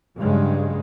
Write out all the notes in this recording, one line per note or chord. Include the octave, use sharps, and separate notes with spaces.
G2 C#3 F#3 G#3